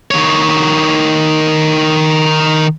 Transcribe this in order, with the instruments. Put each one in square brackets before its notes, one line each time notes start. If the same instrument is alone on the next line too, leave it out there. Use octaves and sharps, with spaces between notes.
[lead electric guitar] D#3 C#5